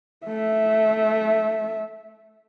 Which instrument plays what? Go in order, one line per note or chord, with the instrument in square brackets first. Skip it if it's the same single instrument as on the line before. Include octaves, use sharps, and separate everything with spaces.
[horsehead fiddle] A3 E5